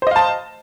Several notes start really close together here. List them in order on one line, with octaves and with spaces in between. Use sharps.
C5 D#5 F5 A5